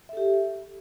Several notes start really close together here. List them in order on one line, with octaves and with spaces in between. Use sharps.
E5 A4 G4